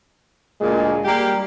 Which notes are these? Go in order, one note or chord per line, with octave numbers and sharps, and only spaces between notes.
D2 A#2 G#3
G3 A#3 G4